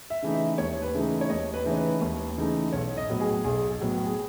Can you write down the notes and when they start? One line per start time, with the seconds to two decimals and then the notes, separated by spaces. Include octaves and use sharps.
0.10 E5
0.23 C#3 E3 A3 D#4
0.34 E5
0.58 D#2 C#5
0.82 B4
0.94 C#3 E3 A3 D#4
1.21 C#5
1.29 D#2 D#5
1.54 B4
1.66 C#3 E3 A3 D#4
1.71 C#5
1.77 B4
2.01 D#2
2.38 C#3 E3 A3 D#4
2.72 B1 C#5
2.97 D#5
3.09 A2 F#3 B3
3.20 G#4
3.44 B1 G#4
3.80 A2 F#3 B3
4.05 G#4